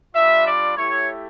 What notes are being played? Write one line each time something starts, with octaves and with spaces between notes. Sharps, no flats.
G3 D4 F4 E5
D5
A3 E4 G4 C#5